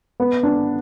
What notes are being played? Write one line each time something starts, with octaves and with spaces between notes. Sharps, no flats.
B3
D4